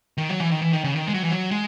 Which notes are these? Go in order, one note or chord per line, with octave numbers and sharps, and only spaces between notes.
D#3
F#3
E3
D#3
E3
D#3
C#3
D#3
G#3
F#3
E3
F#3
G#3